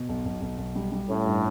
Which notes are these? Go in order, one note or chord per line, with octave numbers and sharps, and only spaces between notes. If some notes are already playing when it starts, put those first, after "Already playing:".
Already playing: B2
B1
B1
B1
B1
G3
G3
A2 C#4
G2